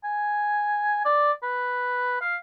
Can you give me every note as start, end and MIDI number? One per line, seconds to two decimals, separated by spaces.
0.04 1.04 80
1.05 1.32 74
1.43 2.16 71
2.21 2.35 77